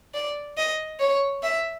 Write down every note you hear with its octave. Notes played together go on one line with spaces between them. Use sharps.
D5
D#5
C#5
E5